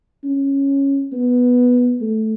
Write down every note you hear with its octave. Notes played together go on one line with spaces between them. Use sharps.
C#4
B3
A3